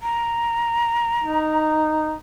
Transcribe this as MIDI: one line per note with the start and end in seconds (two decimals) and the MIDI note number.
0.02 1.72 82
1.23 2.15 63